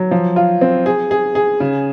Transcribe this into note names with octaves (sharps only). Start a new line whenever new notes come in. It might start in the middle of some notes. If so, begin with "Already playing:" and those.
Already playing: F#3
F3
F4
C4
G#4
G#4
G#4
C#3